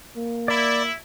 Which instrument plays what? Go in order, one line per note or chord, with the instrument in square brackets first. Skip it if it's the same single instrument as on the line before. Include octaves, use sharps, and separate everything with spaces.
[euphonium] A#3
[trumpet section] E4 [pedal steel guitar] D5 B5